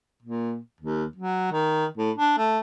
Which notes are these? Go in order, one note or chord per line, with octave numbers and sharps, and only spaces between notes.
A#2
D#2
F#3
D#3
A2
D4
A3